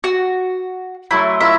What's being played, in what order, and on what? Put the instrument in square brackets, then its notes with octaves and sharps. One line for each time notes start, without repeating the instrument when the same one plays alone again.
[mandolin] F#4
[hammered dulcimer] F#3 A3 C6 [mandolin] E4
[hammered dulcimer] E4 F4 A#4 [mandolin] E5